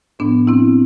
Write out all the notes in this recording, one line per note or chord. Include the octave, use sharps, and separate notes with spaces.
A2 F3 B3 D4
C4 E4